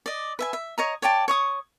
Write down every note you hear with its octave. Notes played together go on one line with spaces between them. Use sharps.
D5 D#5
B4 E5 G#5
E5
C#5 D#5 A#5
C#5 D5 G5 A5
C#5 C#6 D#6